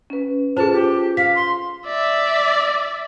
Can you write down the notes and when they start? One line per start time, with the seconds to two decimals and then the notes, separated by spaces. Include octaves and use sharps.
0.10 C#4 B4
0.57 C#4 F4 G#4 A4 C5 A5
0.73 G4
1.17 F5 B6
1.36 C6
1.87 D5 E5